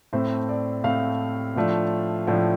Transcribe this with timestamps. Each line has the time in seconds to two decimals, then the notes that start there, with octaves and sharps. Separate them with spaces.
0.13 A2 A3 C4 C5
0.49 D5
0.84 A2 A3 C4 F5
1.56 A2 F3 A3 D4
2.27 A2 F3 A3 D4